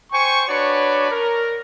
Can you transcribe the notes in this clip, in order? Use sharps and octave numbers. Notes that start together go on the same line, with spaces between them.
C5 G5 G#5 C#6
D4 F#4 B4 C#5 D5
A#4